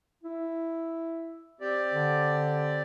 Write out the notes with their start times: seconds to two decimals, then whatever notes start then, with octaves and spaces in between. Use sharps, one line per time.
0.24 E4
1.61 C4 G4 D5
1.94 D3